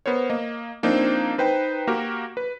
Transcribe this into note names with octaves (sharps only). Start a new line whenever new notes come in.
B3 A#4 C5 C#5
A#3 D#5
F3 A#3 C4 D4 D#4 C5
D#4 B4 C5 G5
A#3 F#4 G4 A#4
B4